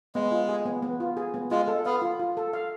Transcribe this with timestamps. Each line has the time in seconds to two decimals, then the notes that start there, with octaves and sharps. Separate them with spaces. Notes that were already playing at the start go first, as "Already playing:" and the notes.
0.15 G#3 B3
0.32 F4
0.49 G#4
0.66 B3
0.82 B3
1.00 F4
1.17 G#4
1.34 B3
1.51 G#3 F4
1.68 A4
1.86 B3 F5
2.02 F4
2.19 F4
2.37 A4
2.53 F5